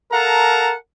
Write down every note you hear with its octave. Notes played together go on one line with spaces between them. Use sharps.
A4 A#4 F5 F#5 A5 A#5